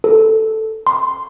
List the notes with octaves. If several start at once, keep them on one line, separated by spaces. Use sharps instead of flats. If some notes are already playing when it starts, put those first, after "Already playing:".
A4
C6